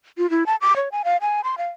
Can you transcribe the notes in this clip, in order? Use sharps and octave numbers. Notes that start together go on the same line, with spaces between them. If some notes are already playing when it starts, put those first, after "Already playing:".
F4
E4
A5
D6
C#5
G#5
F5
G#5
C6
F5